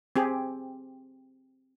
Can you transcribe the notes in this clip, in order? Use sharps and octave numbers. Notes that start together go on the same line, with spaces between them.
C4 G4 G#4